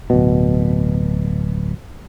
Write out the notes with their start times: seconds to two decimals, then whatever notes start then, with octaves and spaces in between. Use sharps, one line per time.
0.10 D1 B2